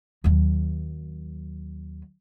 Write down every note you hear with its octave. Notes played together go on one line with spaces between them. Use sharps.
D#2 F#3